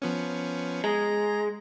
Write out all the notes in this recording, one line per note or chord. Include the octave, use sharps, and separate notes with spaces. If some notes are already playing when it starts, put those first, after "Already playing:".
F3 B3 C#4
G#3 A#5